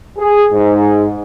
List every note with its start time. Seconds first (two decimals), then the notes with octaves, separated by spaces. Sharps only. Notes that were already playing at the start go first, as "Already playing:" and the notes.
0.17 G#4
0.52 G#2